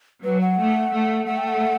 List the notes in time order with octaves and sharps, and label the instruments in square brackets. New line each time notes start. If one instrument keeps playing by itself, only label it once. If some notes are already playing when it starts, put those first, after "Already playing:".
[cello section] F#3 [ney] B4
[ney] F#5
[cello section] A3
A3
[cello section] A3 [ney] F#5
[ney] G5
F#5